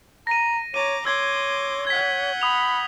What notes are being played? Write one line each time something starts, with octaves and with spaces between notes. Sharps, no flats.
A#5 A#6 D#7
C#5 A#5 D6 D#7
C#5 C6 D6 E6 G#6
F#5 G6 G#6 B6
B5 D#6 F7